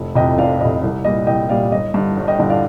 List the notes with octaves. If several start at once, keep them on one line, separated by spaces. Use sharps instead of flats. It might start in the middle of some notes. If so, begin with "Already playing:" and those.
Already playing: F1
F2 C3 D#5 G5
F1 D5 F5
F2 C3 D#5
C2
A#2 G3 D#5
C2 D#5 G5
A#2 G3 D5 F5
G1 D#5
G2 D3
G1
D#5 G5
G2 D3 D#5
D5 F5